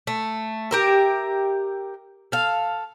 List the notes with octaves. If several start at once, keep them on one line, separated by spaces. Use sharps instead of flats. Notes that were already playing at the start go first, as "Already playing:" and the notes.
A3
G4 A#4 E5
A4 F5